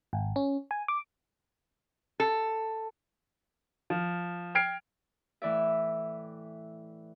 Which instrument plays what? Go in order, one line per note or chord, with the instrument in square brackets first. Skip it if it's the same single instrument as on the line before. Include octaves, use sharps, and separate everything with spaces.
[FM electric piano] G#1
C#4
G#5
D6
[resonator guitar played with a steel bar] A4
[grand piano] F3
G5 F6 G#6 C7 D7
[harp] A2 E3 D5 E5